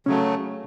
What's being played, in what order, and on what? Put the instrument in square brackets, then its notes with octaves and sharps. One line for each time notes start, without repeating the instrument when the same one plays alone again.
[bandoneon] C#3 F#3 A3 [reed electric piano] C#4